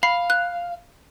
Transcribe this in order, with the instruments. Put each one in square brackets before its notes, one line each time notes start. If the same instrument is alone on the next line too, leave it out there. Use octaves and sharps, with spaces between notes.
[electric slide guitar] F5 [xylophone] B5 C7
[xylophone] F#6